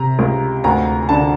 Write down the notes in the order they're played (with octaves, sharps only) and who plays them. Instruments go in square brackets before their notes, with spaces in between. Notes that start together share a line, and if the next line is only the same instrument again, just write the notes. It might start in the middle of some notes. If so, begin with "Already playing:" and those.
Already playing: [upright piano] C3 A#5
C#2
D2 A#5
D3 A5